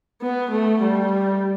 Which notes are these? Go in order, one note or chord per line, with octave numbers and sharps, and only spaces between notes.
B3
A3
G3